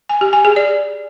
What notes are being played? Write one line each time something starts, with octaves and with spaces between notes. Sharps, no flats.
G#5
G4
G#5
G#4
D5